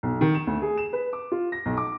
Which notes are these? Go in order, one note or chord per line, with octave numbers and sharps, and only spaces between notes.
B1
D#3
E7
D2
G#4
E7
B4
D6
F4
A#6
B1
D6